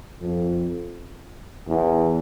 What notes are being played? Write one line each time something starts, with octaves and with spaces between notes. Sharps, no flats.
F2
E2